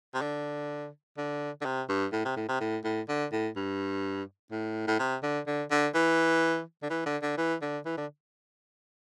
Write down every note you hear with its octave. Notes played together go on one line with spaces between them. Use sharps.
C3
D3
D3
D3
C3
G2
A2
C3
A2
C3
A2
A2
D3
A2
G2
A2
A2
C3
D3
D3
D3
E3
D3
E3
D3
D3
E3
D3
E3
D3